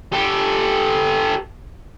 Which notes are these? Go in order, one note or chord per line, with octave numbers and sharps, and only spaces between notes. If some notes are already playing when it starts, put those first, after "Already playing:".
G4 A4